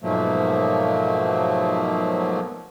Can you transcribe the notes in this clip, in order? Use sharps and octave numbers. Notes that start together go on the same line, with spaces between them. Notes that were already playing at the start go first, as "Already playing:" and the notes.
G#2 B2 F3 F#3 A3 A#3